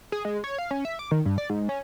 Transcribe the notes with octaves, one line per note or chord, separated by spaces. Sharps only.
G#4
G#3
C#5
F5
C#4
E5
D6
D#3
G2
D5
G#2
C#4